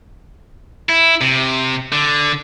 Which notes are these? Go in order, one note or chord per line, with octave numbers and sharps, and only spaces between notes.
E4
C3
D3